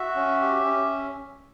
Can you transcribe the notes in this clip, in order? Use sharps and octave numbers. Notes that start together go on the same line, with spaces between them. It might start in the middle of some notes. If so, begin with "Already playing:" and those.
Already playing: F#4 E5
C#4
G4
C#4